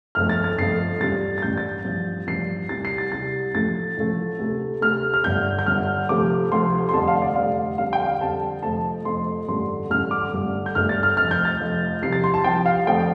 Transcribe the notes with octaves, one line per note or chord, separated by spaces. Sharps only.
G1 F2 F3 A3 F6
A6
A6
G1 F2 F3 A3 C7
A1 G2 G3 A6
A6
A1 G2 G3 G6
A6
A1 G2 F3
A1 G2 F3 C7
C2 C3 G3 A6
C7
A6
C2 C3 G3 A6
A1 A2 F3 A3 A6
A1 A2 F3 A3
D2 C3 A3
D2 C3 A3 F6
F6
G1 G2 D3 G6
G6
G1 G2 D3 F6
D2 C3 F3 A3 D6
D2 C3 F3 A3 C6
C6
F1 F2 D3 G3 A5
F5
D5
F1 F2 D3 G3 F5
F2 D3 G3 F5
G5
F5
F2 D3 G3 A5
F1 F2 F3 A3 A5
F1 F2 F3 A3 C6
A1 G2 D3 A3 C6
A1 G2 D3 A3 F6
D6
G1 G2 D3 A3
G6
G1 G2 D3 A3 F6
A6
F6
F1 F2 F3 F6
G6
A6
F1 F2 F3
C2 C3 F3 C7
A6
C6
A5
C2 C3 F3 G5
F5
F2 D3 F3 A3 G5